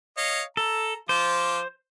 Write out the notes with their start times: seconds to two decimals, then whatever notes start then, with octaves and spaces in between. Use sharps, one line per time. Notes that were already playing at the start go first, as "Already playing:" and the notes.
0.18 C#5 D#5 F5
0.57 A4 A#5
1.09 F3 F4 C5 D6